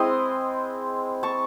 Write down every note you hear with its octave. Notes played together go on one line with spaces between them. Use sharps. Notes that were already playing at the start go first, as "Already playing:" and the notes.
Already playing: G#3 C4 E4 C6 D#6
A5 C#6